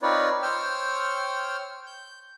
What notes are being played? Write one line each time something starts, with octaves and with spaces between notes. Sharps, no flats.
C4 D#4 F4 B4 C#5 D5
C5 C#5 G5 E6 F6
G6